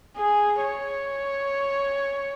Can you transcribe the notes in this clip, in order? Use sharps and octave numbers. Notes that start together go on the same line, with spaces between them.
G#4
C#5